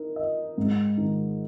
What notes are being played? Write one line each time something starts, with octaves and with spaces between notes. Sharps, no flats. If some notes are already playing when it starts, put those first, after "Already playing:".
Already playing: D#4 A#4
D#5
G#2
D#3